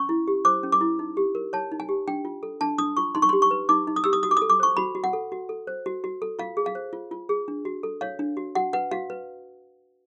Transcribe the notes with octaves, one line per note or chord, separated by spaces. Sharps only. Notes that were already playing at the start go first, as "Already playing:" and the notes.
Already playing: C#4 C#6
E4
G4
C5 D6
C#4
D6
E4
D#4
G4
A#4
C#5 A5
D#4
G#5
G4
D4 G5
F4
A4
D4 A5
D4 D#6
F4 C#6
D#4 C6
C#6
G4 C6
C#6
B4
D#4 D6
D#4
D#6
G4 E6
D#6
F#4 D#6
D6
D#6
A4
D6
C5 C#6
F#4 B5
F#4
F#5
A4
F#4
A4
C5
F#4
F#4
A4
F4 F5
G#4
F5
C5
F4
F4
G#4
D4
F#4
A4
C#5 F5
D4
F#4
F#4 F#5
B4 F#5
F#4 F5
B4